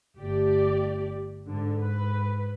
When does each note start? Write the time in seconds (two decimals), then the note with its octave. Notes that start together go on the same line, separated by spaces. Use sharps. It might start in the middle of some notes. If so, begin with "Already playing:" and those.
0.18 G1 A3 G4 D5
1.46 G#2 D3
1.80 B4